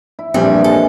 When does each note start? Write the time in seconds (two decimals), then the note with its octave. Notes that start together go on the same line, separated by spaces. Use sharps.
0.19 E4
0.34 A#1 A#2 E3 G3 C4 D4 E5
0.64 G#3 A4